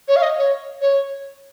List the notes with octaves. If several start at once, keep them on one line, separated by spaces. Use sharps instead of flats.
C#5
F5
D#5
C#5
C#5